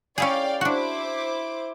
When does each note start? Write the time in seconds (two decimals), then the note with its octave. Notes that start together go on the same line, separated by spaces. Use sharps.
0.18 C#4 E4 G#4 D5 F5 G5
0.61 D4 E4 F#4 C5 D6